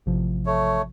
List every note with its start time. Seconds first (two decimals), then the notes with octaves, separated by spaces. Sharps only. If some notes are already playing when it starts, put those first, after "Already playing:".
0.06 A1 C3 F3
0.46 A3 C#5